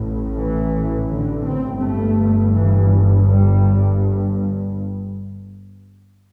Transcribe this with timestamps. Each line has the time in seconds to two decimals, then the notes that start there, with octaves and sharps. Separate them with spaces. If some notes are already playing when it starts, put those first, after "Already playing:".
Already playing: A1 A2
0.37 E3
1.09 D3
1.46 C4
1.82 G1 G2 A3
2.55 E3
3.28 G3